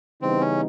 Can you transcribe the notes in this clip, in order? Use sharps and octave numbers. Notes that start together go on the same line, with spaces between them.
C#3 E3 G3 B3 C4 D#4
C#4